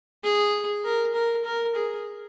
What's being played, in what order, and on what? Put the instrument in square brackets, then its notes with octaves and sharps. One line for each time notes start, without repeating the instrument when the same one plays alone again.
[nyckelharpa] G#4
A#4
A#4
A#4
G#4